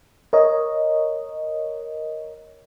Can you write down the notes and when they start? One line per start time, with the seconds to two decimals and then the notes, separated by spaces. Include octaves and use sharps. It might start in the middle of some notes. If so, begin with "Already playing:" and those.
0.33 A#4 C#5 D#5